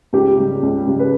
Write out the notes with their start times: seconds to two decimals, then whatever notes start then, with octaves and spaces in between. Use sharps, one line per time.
0.13 C#2 G4
0.37 C#3 G3
0.63 C#2
0.87 C#3 G3
0.99 B4